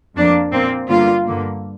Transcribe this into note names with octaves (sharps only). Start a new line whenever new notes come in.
F2 F3 A#3 D4
A#2 A#3 C4
G2 D3 A#3 F4
G2 D3 A#3